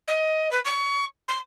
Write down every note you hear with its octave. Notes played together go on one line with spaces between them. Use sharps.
D#5
B4
C#6
C6